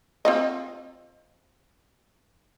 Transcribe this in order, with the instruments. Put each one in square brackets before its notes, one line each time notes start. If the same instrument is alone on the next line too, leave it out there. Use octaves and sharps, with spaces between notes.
[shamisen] C4 F4 D#5